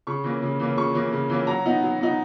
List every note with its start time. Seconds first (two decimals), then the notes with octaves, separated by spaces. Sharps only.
0.07 C#3 C#6
0.24 E3 A#3 C#4
0.42 C#3
0.60 E3 A#3 C#4
0.77 C#3 C#6
0.94 E3 A#3 C#4
1.13 C#3
1.29 E3 A#3 C#4
1.47 F#3 A#5
1.65 B3 D#4
1.82 F#3
2.00 B3 D#4